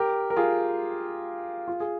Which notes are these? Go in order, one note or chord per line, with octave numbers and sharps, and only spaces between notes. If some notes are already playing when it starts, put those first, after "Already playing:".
Already playing: G4 A#4
A#4
F4 G#4
F4
G#4